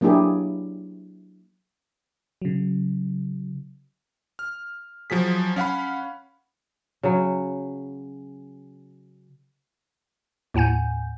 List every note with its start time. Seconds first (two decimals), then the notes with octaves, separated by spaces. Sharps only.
0.01 F#3 A#3 D4 E4 G4 G#4
2.42 C#3 F#3
4.39 F6
5.10 F3 F#3 G#4 B6
5.56 C#4 F5 F#5 B5
7.03 C#3 F#3
10.54 D#2 A2 F#5 G#5 G6